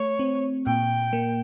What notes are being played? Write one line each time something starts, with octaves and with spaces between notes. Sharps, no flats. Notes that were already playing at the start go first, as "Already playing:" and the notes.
Already playing: A3 C#5
C4
A#2 G5
A#3